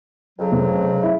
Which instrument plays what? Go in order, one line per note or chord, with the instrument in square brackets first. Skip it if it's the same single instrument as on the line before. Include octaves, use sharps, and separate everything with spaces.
[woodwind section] F2 C#3 F#3
[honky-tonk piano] F1
E4